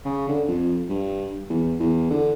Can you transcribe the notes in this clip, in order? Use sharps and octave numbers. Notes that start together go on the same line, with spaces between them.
C#3
D3
F2
G2
E2
E2
D3